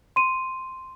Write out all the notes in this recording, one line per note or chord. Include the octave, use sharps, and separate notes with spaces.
C6 D#7